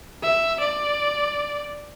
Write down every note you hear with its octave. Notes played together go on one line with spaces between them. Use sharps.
E5
D5